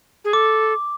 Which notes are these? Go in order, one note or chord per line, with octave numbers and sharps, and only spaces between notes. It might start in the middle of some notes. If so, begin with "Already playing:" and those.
G#4
A4 D6